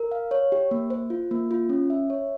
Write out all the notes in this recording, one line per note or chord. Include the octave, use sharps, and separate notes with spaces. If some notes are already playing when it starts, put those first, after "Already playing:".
Already playing: A#4
F5
C#5
G4
A#3
C5
F4
A#3
F4
C#4
E5
C#5